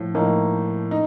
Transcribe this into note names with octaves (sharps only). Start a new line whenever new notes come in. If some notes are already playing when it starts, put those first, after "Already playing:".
Already playing: A2 F3
A2 F3 A#3 D#4
D#4